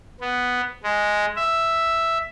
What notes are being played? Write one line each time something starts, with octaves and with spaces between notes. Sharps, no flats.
B3
G#3
E5